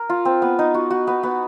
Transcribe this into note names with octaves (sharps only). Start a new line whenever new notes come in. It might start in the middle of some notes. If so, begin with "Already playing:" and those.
Already playing: A#4
F4
C4
B3
D#4
F#4
F#4
B3
B3